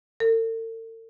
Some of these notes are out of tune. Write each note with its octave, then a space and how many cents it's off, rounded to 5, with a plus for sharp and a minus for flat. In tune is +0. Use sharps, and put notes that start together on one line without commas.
A4 +45